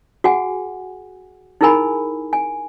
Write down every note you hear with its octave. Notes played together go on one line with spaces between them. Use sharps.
F#4 G#4 F#5 G#5
D#4 E4 G#4 A#4 G#5 B5
G#5